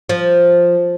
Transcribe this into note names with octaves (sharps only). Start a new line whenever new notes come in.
F3